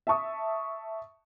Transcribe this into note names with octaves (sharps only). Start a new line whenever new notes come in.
E5 A5 C#6 D#6